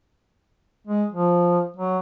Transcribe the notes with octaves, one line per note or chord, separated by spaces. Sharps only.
G#3
F3
F#3